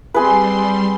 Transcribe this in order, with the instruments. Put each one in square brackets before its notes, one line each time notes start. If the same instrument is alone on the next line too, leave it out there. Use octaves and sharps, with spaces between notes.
[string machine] G3 C6 [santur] C4 G#4 B4